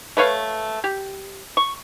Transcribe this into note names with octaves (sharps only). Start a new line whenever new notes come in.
A3 B4 C#5 F5
G4
C#6